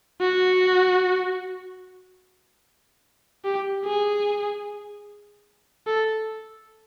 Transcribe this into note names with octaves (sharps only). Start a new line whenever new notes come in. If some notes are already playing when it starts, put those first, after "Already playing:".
F#4
G4
G#4
A4